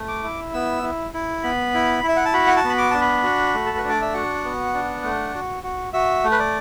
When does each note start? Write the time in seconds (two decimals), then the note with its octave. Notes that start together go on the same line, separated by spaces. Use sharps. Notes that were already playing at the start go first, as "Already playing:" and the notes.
Already playing: A3
0.08 D6
0.23 E4
0.54 B3 E6
0.83 E4
1.14 E4
1.43 B3 B5
1.74 E4
2.03 E4
2.08 E5
2.16 F#5
2.25 A5
2.33 F#4 B5
2.47 F#5
2.57 A5
2.64 B3
2.70 B5
2.78 D6
2.91 D4 A5
3.01 B5
3.23 F#4
3.54 A3
3.66 A4
3.77 B4
3.84 D4
3.89 D5
4.02 E5
4.14 F#4 F#5
4.44 B3
4.74 D4
5.04 A3
5.35 F#4
5.63 F#4
5.93 F#4 E5
6.24 A3
6.31 B4
6.39 D5